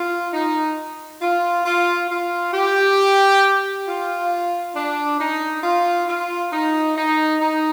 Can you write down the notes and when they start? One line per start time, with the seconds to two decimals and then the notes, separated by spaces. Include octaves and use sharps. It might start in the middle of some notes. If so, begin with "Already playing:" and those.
Already playing: F4
0.32 D#4
1.21 F4
1.65 F4
2.10 F4
2.53 G4
3.86 F4
4.75 D4
5.19 D#4
5.63 F4
6.07 F4
6.52 D#4
6.96 D#4
7.41 D#4